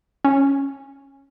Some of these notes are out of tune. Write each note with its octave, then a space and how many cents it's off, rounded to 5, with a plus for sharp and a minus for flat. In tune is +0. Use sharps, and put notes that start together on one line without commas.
C#4 -5